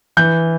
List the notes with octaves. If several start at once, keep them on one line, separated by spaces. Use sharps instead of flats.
E3 G6